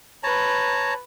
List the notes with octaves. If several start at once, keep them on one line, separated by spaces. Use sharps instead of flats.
B4 C#5 A5 A#5